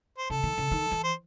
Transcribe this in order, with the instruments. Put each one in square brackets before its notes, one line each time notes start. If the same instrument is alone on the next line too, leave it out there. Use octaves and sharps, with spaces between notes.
[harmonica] C5
[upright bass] C#3 [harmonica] A4
[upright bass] D#3
C#3
D#3
E3
[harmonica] C5